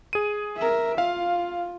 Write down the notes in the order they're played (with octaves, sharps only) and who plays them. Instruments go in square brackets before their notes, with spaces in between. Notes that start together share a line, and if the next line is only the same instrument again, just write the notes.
[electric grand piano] G#4 D#7
[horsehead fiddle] A#4 E5
[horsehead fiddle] F4 [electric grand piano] F5